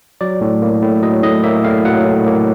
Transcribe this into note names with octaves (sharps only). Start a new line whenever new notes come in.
F#3 D5
A2
A#3
A2
F#3 D#5
A2 D#5
A#3 E5
A2 F5
F#3 F#5
A2
A#3